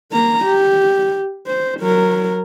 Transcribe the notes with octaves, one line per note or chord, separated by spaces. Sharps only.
A#3 A#5
G4
C5
F#3 A#4